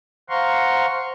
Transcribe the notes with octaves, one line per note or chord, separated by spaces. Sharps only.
C5 F5 F#5 A#5 C6 C#6